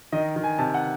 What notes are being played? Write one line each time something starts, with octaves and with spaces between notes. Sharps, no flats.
D#3 D#5
D#3
G#5
C3 A5
F#5